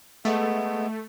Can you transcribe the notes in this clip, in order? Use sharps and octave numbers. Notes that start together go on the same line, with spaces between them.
G#3 A3 B3